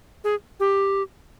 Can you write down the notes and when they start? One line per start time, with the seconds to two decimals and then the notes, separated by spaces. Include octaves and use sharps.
0.24 G#4
0.60 G4